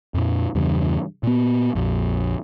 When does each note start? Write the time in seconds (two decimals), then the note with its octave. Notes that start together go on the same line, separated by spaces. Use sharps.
0.14 F2 A#2
0.55 E2 G2 C#3 E3
1.23 A#2 B3
1.75 A#1 F2